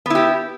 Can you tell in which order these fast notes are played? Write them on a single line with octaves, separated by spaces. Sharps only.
B3 E4 G4